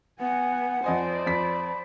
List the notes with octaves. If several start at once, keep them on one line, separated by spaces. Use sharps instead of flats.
B3 F#5 G#5
F2 C5 D5 D#5 G#5
F2 B5 B6